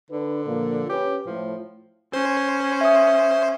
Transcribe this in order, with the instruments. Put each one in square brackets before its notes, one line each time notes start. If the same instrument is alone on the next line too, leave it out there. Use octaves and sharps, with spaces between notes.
[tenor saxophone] D3 [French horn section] D4 B4
[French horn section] A#2 F3 A#3
[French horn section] C#4 B4 [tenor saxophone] G4
[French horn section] A2 [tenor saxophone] F3
[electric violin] C#4 [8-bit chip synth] C5
[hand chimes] E5 D#6